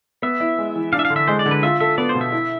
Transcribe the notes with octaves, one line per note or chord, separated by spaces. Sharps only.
B3 E5
E4
G#3
E3
D4 F5
E5
F5
D3
E5
G#3 C5
D5
D3
B4
F4 E5
A4 E5
B3 D5
C5
B2
E5
E4